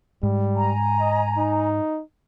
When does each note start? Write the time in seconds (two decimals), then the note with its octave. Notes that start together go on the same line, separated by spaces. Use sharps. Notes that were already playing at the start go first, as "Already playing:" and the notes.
0.23 G#2 G3
0.56 G#5 A#5
1.00 D#5
1.38 D#4